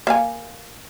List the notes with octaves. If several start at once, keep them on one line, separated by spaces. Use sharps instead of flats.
A#3 F5 G#5